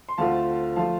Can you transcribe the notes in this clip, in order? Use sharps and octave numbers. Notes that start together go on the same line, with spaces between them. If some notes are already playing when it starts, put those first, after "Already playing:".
C6
D2 D3 A3 C4 F4 F5 A5
F3 A3 F4 F5 A5